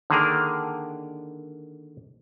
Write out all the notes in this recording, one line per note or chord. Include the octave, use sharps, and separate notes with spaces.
D3 D#3 A#3 D4 G#4 A#4